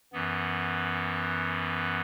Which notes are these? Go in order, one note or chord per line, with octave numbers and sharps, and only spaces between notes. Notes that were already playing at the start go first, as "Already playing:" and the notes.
F#2 E3 B3